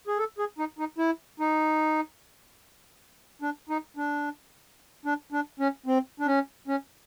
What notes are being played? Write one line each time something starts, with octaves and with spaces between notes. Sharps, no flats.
G#4
A4
G#4
D#4
D#4
E4
D#4
D4
D#4
D4
D4
D4
C#4
C4
D4
C#4
C#4